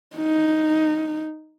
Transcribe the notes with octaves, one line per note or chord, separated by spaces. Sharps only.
D#4